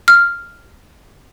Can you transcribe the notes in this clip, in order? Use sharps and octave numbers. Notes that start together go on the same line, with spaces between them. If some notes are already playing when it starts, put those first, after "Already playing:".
F6